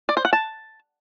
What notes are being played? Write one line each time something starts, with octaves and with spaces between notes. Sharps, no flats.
D5
C5
F#5
A5